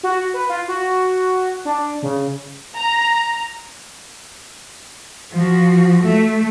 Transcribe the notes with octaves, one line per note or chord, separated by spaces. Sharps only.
F#4
B4
F4
F#4
D4
C#3
A#5
F3 F#4
A3